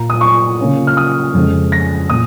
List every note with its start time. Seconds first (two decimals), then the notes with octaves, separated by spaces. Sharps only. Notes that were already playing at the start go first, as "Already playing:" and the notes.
Already playing: A#2 A#3 F4 A#5
0.10 D#6
0.21 C#6
0.59 C#3 A#3 C#4 F4
0.87 F6
0.97 D#6
1.34 F2 C#3 G#3
1.72 A#6
2.10 A#2 D#6